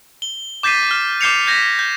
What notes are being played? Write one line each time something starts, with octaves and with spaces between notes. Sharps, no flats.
G7
D6 G6 A6 B6 C7 D#7
F6
D6 F6 G6 C7 C#7 F7
G6 G#6 A#6 B6
G6